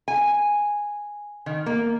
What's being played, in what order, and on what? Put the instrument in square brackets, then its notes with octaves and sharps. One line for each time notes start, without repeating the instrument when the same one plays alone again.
[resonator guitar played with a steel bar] G#5
D#3
A#3